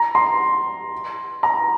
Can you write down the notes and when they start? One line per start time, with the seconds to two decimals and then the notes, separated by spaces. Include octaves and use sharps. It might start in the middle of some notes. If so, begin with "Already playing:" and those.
Already playing: A#5
0.15 C6
1.43 A#5